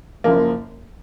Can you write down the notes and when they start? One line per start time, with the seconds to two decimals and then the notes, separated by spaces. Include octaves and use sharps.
0.24 F#1 F#2 F3 A#3